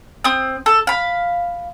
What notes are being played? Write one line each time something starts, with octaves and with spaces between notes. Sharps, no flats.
C4 D#6
A4
F5 B5